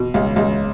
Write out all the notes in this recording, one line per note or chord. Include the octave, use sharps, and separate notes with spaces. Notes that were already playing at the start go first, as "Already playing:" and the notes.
Already playing: B2
C#2
C#2